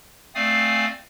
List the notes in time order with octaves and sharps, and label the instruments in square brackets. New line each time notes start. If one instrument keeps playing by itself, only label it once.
[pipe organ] A3 C4 D5 F5 G#5 D#6